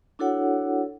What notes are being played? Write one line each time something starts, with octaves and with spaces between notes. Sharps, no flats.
D4 E4 F#4 A4 C#5 F#5